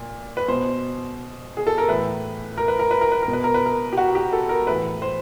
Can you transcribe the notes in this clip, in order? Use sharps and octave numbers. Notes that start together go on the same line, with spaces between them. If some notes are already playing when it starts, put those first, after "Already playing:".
Already playing: A#2
B4
B2 C5
G#4
A4
A#4
A2 E3 B4
A#4
B4
A#4
B4
A#4
B4
A#4
B2
B4
A#4
B4
A#4
G4
F#4
G4
A4
A#4
A2 E3 B4
C5